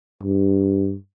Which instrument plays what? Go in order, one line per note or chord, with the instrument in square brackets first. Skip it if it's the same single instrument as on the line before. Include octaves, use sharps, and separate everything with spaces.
[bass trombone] G2